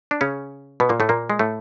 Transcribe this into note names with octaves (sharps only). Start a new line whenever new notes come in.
D4
C#3 C#4
B2 B3
A#2 A#3
A2 A3
A#2 A#3
G#3
A2 A3